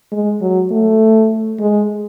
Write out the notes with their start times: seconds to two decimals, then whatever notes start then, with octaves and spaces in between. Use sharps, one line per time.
0.12 G#3
0.41 F#3
0.71 A3
1.60 G#3